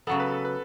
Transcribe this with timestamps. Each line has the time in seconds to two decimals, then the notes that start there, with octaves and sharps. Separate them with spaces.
0.07 C#3 F#3 B3 A4
0.20 B4
0.32 A4
0.45 B4